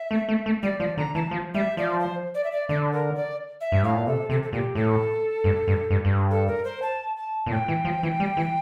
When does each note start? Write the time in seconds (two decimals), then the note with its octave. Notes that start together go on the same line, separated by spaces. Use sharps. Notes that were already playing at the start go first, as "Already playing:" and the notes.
Already playing: E5
0.11 A3
0.29 A3
0.46 A3
0.63 G3 D5
0.80 F3 D5
0.97 D3 A#5
1.14 E3 A5
1.31 F3
1.54 G3 E5
1.77 F3 D5
2.00 C5
2.34 D5
2.44 E5
2.52 D5
2.69 D3 D5
2.92 A#4
3.15 D5
3.61 E5
3.72 G2
3.83 A2 F5
3.95 A#2
4.06 C3 A4
4.29 C3 A4
4.43 A4
4.52 A#2 G4
4.75 A2 A4
5.44 G2
5.68 G2
5.90 G2
6.05 G2
6.31 A4
6.48 A#4
6.65 C5
6.82 A5
7.16 A5
7.46 A#2
7.51 A2 G5
7.68 E3
7.85 F3
8.03 E3
8.20 G3
8.37 E3